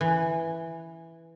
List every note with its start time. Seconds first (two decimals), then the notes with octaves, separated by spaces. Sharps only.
0.01 E3